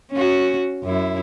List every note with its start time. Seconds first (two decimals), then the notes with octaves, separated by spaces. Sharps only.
0.12 C#4 F#4
0.84 F#2 E4